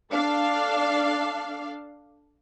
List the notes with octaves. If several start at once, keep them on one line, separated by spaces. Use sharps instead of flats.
D4 A4 F5